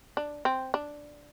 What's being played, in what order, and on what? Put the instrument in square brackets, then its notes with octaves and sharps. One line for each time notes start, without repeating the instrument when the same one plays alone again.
[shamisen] D4
C4
D4